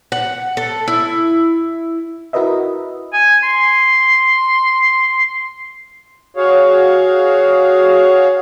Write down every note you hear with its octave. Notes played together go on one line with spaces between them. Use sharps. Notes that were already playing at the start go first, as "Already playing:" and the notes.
F#5
A4
E4
E4 F#4 A#4 B4 D#5 E5
G#5
C6
F#4 G#4 C#5 F5